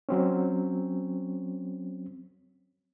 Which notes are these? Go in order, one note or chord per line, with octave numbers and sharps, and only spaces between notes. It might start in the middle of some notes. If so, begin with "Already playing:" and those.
F#3 C4 C#4